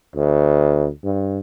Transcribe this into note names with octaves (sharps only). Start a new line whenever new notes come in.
D2
G2